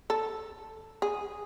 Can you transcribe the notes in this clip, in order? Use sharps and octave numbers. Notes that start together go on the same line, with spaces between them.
A4
G#4